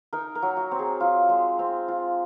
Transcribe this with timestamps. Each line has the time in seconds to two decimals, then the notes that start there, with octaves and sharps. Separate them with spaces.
0.13 D#4 A#4
0.35 A#4
0.42 F#3
0.57 F#4
0.71 C4
0.79 G#4
1.00 F4
1.29 G#3
1.59 C4
1.88 F4